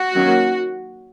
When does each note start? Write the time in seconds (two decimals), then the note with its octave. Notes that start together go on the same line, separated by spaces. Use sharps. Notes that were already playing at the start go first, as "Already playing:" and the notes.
Already playing: F#4
0.14 D#3 F#3 A#3 C#4